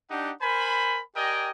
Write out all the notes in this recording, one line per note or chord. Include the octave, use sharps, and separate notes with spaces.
D4 D#4 G4 D#5 F#5
A#4 C5 G#5 B5
G4 A#4 D5 D#5 G5 G#5